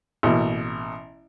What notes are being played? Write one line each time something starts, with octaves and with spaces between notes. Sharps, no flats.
A1 B2 A#3